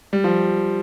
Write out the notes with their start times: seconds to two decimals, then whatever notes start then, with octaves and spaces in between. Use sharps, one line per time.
0.13 G3
0.24 F3